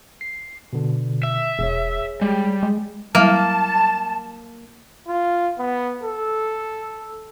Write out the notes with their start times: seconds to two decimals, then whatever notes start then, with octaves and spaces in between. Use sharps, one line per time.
0.21 C7
0.73 B2 D3
1.23 E5
1.59 E1 G#4 C#5
2.21 G3 G#3
2.63 G#3
3.15 F#3 G3 A#3 E4 A5
5.08 F4
5.59 B3
6.03 A4